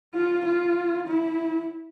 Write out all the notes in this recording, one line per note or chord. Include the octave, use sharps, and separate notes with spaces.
F4
F4
E4